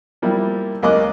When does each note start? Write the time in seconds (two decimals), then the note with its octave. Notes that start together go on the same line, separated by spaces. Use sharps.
0.22 F3 G3 A#3 E4
0.83 C#2 A#3 D#5 D6 F#6